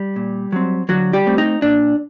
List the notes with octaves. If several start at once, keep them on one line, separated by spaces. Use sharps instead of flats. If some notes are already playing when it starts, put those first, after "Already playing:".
Already playing: G3
A#2
F#3 C4
D3 F#3 F#4
G3 G4
A3 C4
D#4
A#2 D4